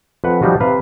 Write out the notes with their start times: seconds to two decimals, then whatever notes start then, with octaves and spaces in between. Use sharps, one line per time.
0.24 F2 B4 F#5
0.42 F3 G3 D#4 F4 F#4
0.60 C3 B4 F5